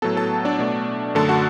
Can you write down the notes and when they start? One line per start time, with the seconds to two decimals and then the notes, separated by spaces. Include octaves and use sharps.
0.02 A2 F#3 B3 A4 A5
0.17 A4 A5
0.45 D4 D5
0.59 B2 A3
1.15 F#2 D3 A3 A4 A5
1.29 F#4 F#5